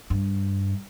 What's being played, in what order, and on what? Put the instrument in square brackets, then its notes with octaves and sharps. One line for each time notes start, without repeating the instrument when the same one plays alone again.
[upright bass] G2